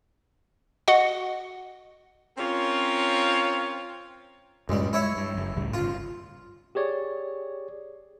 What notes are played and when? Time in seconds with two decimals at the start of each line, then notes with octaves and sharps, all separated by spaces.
0.88 F#4 D#5 F#5
2.37 C4 C#4 F4 A#4 C#5
4.69 C#2 F#2 A2 G3 G#3
4.93 G#3 E4 C#5 E5
5.16 G2
5.34 F#1 F#2
5.57 C#2 A2 G3
5.74 G1 C#3 F4
6.75 G4 G#4 C#5 D5